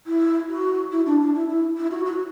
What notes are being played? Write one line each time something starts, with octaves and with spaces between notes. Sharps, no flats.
E4
F#4
E4
D4
D4
E4
E4
E4
F#4
F#4